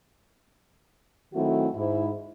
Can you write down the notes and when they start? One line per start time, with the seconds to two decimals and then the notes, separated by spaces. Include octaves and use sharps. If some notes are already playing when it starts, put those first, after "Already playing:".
1.34 D#3 F#3 A3 C4 E4 F#4
1.75 G#2 E4